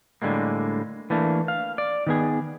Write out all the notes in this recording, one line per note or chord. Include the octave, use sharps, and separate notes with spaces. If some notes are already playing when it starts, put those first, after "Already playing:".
A2 D3 G3 G#3 A#3
E3 A3 A#3 D4
F5
D5
D#3 B3 G#4